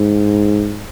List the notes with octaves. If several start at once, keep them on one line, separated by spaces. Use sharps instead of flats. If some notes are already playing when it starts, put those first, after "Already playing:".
Already playing: G#2